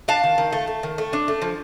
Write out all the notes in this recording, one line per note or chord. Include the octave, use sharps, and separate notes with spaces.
D4 F5 A5
D#3
D#3
A3
A3
D#3
A3
D4
A3
F3